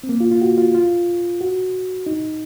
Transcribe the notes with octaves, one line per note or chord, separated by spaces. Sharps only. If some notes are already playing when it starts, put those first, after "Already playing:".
C4
A#3
F4
F4
F#4
F4
F4
F#4
D#4